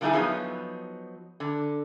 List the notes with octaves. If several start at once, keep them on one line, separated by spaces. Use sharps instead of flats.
D3 G3 A3 D#4 E4 G#4
F3 F#3 B3 D#4
D3